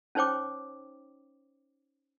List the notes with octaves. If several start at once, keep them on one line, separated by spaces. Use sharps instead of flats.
C#4 D#4 C5 C#5 G5 D6